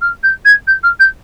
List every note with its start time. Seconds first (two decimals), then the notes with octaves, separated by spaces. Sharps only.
0.01 F6
0.23 G6
0.45 G#6
0.67 G6
0.83 F6
0.99 G6